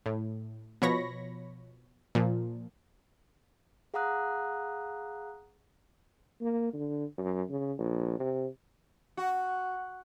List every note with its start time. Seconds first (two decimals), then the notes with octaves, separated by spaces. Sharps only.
0.06 A2
0.82 B2 F3 C#5 B5 C#6 A#6
2.15 A#2 F3
3.94 G#4 F5 F#5 A#5 D#6 F#6
6.41 A#3
6.73 D3
7.18 F#2
7.50 C#3
7.78 A#1
8.20 C3
9.17 F#4